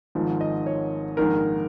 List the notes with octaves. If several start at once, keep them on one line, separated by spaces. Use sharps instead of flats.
G#1 G#2 F3
D#5
C#5
A#1 G#2 D#3 A#4